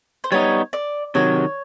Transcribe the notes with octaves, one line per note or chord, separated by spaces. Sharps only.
C5
G3 B3 D#4 C#5
D5
C3 D#3 F#3 C#5